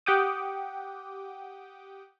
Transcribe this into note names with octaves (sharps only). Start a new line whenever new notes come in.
G4 F#5 G5 D6 D#6